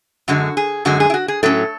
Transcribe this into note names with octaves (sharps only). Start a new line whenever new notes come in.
F#2 D3 G#3 F#4
G#4
F#2 D3 G#3 F#4
G#4
E4
F#4
G#4
A2 F#3 C#4 A4